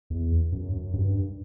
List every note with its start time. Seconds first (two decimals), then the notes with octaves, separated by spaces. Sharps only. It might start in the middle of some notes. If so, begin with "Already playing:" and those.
0.10 E2
0.52 F#2
0.73 F#2
0.94 G2